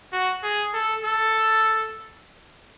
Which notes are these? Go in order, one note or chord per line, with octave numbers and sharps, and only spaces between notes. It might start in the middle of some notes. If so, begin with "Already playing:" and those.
F#4
G#4
A4
A4